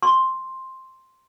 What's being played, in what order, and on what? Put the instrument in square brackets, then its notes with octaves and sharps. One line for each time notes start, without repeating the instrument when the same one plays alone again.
[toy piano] C6